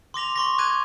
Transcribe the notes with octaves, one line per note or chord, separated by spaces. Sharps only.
C6 D6 A#6 F7
C6 C#6 A#6
D6 F#6 G#6 A#6 D#7